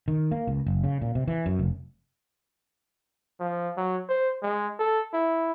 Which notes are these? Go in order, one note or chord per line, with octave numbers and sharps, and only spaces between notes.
D#3
A#3
C#2
F#1
C#3
A#2
C3
E3
F#2
F1
F3
F#3
C5
G#3
A4
E4